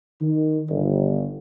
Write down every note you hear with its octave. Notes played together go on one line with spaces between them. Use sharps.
D#3
G1